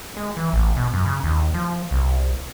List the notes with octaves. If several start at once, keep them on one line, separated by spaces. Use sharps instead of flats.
G#3
E3
A1
B2
F#2
C#3
D#2
F3
C2